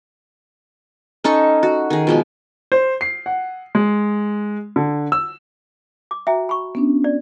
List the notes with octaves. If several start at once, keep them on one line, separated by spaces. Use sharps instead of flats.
C#4 D#4 A4 C#6
F#4
D#3 G#4
B2 F3 G#3
C5
C7
F#5
G#3
D3
E6
D6
F#4 E5 G5 A#5
B5 C#6
B3 C#4 D4
D5